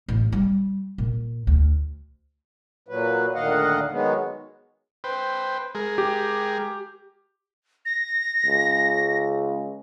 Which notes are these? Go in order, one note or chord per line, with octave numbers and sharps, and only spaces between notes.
A1
G3
A#2
D2
A#2 F#3 B4
D2 A#2 D#3 D#5 F5 F#5
D#3 F#3 G#3 B3
B4 C5 G5
G#3 G#4 A#4
G4
A#6
C#2